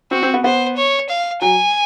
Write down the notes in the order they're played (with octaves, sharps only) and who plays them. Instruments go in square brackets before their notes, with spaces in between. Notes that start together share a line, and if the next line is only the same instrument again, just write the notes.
[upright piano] C4 [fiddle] F#4
[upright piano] C4
B3
[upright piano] B3 [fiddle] C5
[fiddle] C#5
F5
[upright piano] F#3 [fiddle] G#5